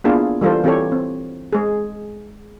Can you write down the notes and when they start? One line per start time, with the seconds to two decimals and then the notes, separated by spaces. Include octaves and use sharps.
0.04 A#3 B3 D4 E4 F4 G#4
0.41 E3 G3 F4 A4 C5
0.64 E3 C4 G4 A4 C#5
0.92 C4
1.53 G#3 G#4